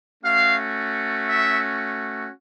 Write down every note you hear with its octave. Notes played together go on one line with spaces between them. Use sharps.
A3 C#4 F#4 F5
E5